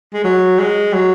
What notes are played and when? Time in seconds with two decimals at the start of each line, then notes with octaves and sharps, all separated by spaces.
0.14 G#3
0.24 F#3
0.59 G#3
0.93 F#3